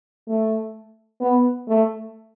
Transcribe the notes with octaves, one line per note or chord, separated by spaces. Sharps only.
A3
B3
A3